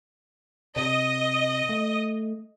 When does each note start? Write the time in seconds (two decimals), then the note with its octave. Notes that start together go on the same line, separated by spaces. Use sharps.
0.76 C3 D#5
1.69 A3